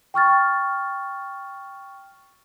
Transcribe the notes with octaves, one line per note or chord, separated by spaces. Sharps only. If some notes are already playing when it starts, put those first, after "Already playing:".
G5 C#6 F6 A6